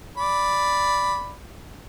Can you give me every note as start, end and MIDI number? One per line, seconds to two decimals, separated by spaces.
0.17 1.33 74
0.17 1.33 83